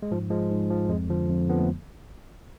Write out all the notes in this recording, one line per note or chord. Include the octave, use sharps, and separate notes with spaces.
G#3
G#2 F3
F3 G#3
G#2
F3
F2 G#3
D3 F3
F2
D3 F3 B3
A3